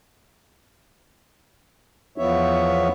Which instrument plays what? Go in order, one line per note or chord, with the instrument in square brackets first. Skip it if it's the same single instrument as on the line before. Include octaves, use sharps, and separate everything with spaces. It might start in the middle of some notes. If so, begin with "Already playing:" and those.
[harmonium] E2 F3 B3 C#5 E5